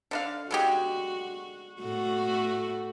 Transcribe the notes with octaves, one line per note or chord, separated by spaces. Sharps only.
D3 D4 F5
D3 G#3 F#4 G4
A2 A3 F#4